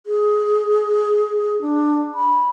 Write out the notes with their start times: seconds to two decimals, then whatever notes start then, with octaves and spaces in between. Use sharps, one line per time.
0.07 G#4
1.61 D4
2.15 B5